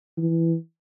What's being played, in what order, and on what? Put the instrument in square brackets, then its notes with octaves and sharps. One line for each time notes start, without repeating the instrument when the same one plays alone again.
[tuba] E3